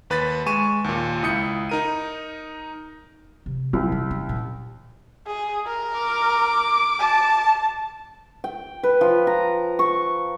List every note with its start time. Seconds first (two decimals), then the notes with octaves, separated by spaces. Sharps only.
0.10 D#2 B4 B5 A6 B6
0.46 G#3 G#5 C#6 D#7 E7
0.84 D#2 A#2
1.23 C#2 E4 D#6 G6 C#7
1.69 D#4 A#4 D#7
3.46 C3
3.73 C2 F#3
3.92 D#4
4.11 C#4
4.29 A#2
5.27 G#4
5.66 A#4
5.98 D6
6.99 A5
8.44 G5
8.83 B4
9.01 F3
9.27 A#5
9.79 C#6